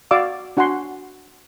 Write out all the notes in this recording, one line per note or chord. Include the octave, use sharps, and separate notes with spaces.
F#4 D5 F5 D6 E6
D4 F#4 F#5 G#5 C6